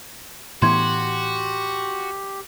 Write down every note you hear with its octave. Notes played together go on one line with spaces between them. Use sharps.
A2 E3 B3 F#4 G4 C6 G#6